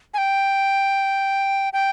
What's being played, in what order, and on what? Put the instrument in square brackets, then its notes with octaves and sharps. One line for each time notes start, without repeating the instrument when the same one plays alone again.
[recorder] G#5
G5
G5